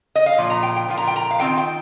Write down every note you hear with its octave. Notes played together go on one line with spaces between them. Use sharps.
D#5
F5
A#2 F3
A#5
G5
G5
A#2 F3 A#3 F4
A#5
G5
A#5
F5
D#3 C4 F4 G5
G5